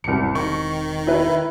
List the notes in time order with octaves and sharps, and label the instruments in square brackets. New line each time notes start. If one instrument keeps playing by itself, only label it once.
[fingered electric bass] E1 C4 [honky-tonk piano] C2 C#7
[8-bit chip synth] D#3 [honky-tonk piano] C#6
[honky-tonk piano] E4 B4